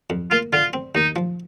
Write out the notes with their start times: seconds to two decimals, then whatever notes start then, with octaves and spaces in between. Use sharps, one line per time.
0.10 F2
0.31 A#3 F4
0.53 D3 F4
0.73 C4
0.95 D#2 D#4
1.16 F3